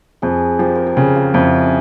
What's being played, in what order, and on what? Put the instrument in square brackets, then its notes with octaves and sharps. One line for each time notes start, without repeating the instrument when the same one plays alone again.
[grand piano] F2 [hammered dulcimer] G#4
[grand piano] F3 [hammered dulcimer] G4
[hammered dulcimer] A#4
G#4
[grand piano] C#3 [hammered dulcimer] G4
[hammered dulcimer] F4
[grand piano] F2 [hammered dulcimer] E4
[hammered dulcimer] C#4